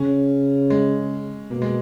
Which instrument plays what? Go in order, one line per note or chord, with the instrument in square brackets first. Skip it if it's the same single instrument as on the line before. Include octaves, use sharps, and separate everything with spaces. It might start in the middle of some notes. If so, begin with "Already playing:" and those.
Already playing: [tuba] C#3 [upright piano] C#4
[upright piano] G#3
[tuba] B2 [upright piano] A#3
[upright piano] G#3